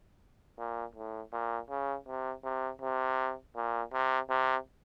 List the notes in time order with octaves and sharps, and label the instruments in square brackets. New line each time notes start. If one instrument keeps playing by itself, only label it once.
[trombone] A#2
A2
A#2
C#3
C3
C3
C3
A#2
C3
C3